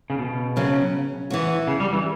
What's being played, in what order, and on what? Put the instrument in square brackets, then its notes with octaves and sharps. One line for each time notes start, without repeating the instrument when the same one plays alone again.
[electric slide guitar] C#3
B2
[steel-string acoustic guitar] F#2 C#3 F#3 C#4
E3 B3 F#4
[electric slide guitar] C#3
G3
E3